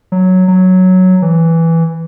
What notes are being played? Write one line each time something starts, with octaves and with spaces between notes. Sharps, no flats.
F#3
F#3
E3